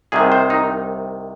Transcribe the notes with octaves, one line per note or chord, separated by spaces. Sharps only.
C2 C3 D#3 G#4
C5
D#4